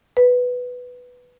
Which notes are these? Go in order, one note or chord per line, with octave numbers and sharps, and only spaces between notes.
B4